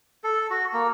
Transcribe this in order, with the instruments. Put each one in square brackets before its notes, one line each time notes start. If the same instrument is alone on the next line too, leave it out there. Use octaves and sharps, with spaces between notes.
[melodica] A4
F#4
A#3